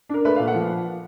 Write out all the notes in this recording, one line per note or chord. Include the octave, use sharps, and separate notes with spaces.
D4 A#4
A3 B4
A#2 F5
F#5
F3